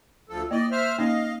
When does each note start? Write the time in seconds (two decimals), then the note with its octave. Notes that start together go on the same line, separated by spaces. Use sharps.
0.29 D2 F3 A4
0.51 A#3 E4 D5 D#5
0.72 C5 E5 F6
0.98 A#3 C#4 D#4 D#5 F5